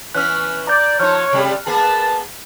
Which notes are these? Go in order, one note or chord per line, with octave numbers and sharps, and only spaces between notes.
E3 B3 C#4 F6 F#6
D5 A#5 G6
F3 D#4 C#5 F6 F#6
C3 G3 A3
A#3 B3 G#4 B4 A5